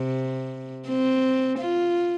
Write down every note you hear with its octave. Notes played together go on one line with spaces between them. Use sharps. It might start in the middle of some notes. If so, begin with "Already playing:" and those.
Already playing: C3
C4
F4